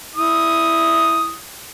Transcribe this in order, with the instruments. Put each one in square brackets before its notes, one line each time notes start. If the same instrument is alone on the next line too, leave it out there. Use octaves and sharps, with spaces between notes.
[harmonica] E4 D#6